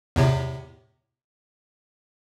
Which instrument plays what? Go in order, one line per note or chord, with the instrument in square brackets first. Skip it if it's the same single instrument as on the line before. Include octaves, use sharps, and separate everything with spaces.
[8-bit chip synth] E2 A2 C3